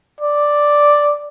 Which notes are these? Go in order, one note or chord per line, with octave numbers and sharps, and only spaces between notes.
D5